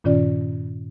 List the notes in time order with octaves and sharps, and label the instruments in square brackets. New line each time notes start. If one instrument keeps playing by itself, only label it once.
[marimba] G2 A#2 D#3 C#4 F4 D5